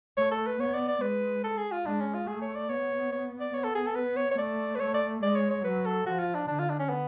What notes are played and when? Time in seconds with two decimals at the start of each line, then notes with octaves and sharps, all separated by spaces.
0.18 A3 C#5
0.32 A4
0.47 B4
0.60 B3 C#5
0.74 D5
0.88 D5
1.01 G#3 B4
1.44 A4
1.57 G#4
1.72 F4
1.86 G#3 D4
2.00 C#4
2.14 F4
2.28 A3 G#4
2.42 C#5
2.55 D5
2.69 B3 C#5
3.12 C#5
3.40 D5
3.54 B3 C#5
3.64 A4
3.75 G#4
3.86 A4
3.96 B4
4.17 C#5
4.31 C#5
4.38 A3 D5
4.75 B4
4.80 A3 C#5
4.94 D5
5.22 G#3 D5
5.36 C#5
5.50 C#5
5.64 F#3 B4
5.86 A4
6.06 F3 F#4
6.20 F4
6.35 D4
6.48 D3 D4
6.59 F4
6.70 D4
6.79 C#4
6.90 B3